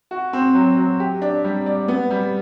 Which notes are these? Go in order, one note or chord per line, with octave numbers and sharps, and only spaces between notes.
F#4
C4
F#3
F#3
G4
D4
G3
D5
B3
G3